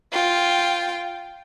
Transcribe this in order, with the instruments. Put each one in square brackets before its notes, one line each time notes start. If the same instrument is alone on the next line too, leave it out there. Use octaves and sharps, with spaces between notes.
[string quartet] F4 G5